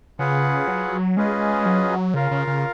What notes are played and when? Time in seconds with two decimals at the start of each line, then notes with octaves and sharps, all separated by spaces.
0.19 C#3 F4 G#4 B4 F#5
0.67 F#3
1.16 G#3 C#4 F4 G#4 B4 D#5
1.66 F#3
2.14 C#3 F4 A#4 F5
2.31 C#3
2.47 C#3